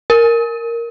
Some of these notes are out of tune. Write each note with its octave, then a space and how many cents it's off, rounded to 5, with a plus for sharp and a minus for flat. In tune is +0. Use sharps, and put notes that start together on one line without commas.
A#4 -5